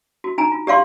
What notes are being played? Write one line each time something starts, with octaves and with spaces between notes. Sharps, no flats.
F#4
D#4 G#5 A#5
F4
G4 D5 F5 C6